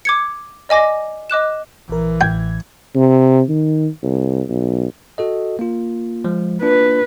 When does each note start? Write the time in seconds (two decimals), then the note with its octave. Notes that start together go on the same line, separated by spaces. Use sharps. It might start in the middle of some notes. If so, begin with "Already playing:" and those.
0.05 D6 G#6 C#7
0.69 D5 D#5 G#5 D6 A#6
1.30 D#5 D6 F#6 E7
1.90 A#1 E3 A#4
2.21 A1 A2 G5 G#6
2.96 C3
3.49 D#3
4.03 C2
4.49 B1
5.18 F#4 A4 D#5
5.59 A#3 F4
6.25 F3 G#3
6.62 A#3 D4 F4 B4